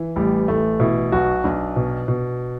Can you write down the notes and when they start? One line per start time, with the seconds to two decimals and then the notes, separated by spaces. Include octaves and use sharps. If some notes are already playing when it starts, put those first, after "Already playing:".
Already playing: E3
0.16 A1 G3
0.48 A1 A3
0.80 B2 E4
1.12 B1 F#4
1.44 B1 D4
1.76 B2
2.08 B2